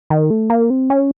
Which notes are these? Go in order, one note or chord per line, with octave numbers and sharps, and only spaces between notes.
D#3
A3
A#3
C4
C#4